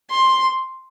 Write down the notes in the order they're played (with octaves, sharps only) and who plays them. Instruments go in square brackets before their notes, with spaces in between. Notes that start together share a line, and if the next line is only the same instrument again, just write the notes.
[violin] C6